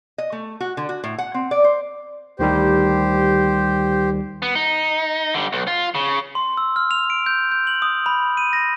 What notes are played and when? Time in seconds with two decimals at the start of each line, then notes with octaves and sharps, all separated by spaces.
0.18 D#5
0.32 A3
0.60 F#4
0.77 D3
0.89 F#4
1.04 A2
1.18 F#5
1.34 C4
1.51 D5
1.64 C5
2.39 D2 D#3 G3 G4 C5
4.42 B3
4.55 D#4
5.34 D3 G3
5.53 B1
5.67 F4
5.95 C#3
6.35 C6
6.57 E6
6.76 F6
6.91 F7
7.10 D7
7.26 G6
7.52 G6
7.67 F#7
7.82 D#6
8.06 B5
8.37 D#7
8.53 A#6